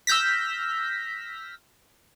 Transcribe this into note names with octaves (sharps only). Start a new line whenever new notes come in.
E6 F6 G6 A#6 B6